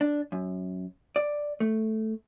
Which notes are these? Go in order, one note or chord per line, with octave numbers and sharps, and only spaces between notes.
D4
F#2
D5
A3